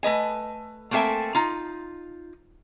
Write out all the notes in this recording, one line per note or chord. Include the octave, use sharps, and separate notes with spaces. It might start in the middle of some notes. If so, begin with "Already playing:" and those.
A3 B4 D#5 G#5
A3 A#3 C4 A4 E5 G#5
D#4 F4